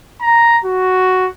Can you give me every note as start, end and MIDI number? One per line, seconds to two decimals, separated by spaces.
0.21 0.58 82
0.64 1.28 66